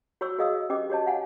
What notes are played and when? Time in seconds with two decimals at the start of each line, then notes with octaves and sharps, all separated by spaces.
0.21 F#4 C#5 C6 C#6 E6
0.38 F#4 G#4 D#5 F5 D#6 E6
0.70 C#4 G4 B4 D#5 D6
0.90 F#4 G4 C#5 D#5 A5
1.06 F5 F#5 G#5